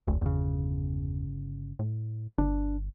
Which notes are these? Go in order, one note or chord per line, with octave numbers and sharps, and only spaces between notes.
F1 D2
G1 E2 C#3
A2
G1 D4